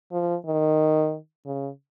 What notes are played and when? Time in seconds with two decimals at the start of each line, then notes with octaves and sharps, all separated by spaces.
0.12 F3
0.46 D#3
1.46 C#3